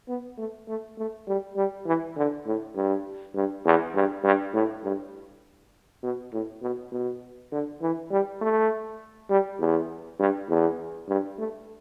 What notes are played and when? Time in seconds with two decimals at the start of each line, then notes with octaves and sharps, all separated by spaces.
0.08 B3
0.38 A3
0.68 A3
0.98 A3
1.27 G3
1.56 G3
1.86 E3
2.17 D3
2.46 A2
2.75 G2
3.35 G2
3.65 E2
3.95 G2
4.24 G2
4.54 A2
4.84 G2
6.02 B2
6.32 A2
6.62 B2
6.92 B2
7.52 D3
7.82 E3
8.11 G3
8.41 A3
9.30 G3
9.59 E2
10.19 G2
10.49 E2
11.08 G2
11.38 A3